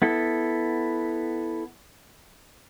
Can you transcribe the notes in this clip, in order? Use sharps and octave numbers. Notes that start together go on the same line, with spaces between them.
B3 E4 A4